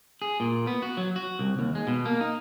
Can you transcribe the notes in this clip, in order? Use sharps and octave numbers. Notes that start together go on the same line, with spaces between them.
G#4
A#2
B3
F#4
F#3
F#4
C2
D#2
G#3
B2
A#3
D#4